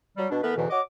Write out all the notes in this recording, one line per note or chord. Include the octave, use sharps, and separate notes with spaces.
F#3 G3
B2 D4
E3 A3 B3 A#4 B4
E2 G#2 B2 D3 E3
F#4 C#5 D#5 D6